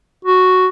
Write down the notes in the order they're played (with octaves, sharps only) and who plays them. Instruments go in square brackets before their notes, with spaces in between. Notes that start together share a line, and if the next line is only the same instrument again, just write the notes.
[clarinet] F#4